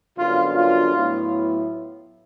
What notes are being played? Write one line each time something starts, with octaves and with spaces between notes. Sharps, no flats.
F#2 D3 G3 B3 D4 F4
F4
A2 F#3 B3 E4